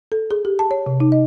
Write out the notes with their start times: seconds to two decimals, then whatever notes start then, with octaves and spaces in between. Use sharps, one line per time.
0.12 A4
0.31 G#4
0.45 G4
0.59 A5
0.71 C#5
0.86 C3
1.00 D#4
1.12 D#5